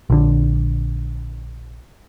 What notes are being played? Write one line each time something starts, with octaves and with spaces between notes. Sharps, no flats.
A#1 D3